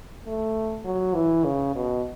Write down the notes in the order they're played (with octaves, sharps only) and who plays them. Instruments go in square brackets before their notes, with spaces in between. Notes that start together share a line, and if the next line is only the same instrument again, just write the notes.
[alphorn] A3
F#3
E3
C#3
B2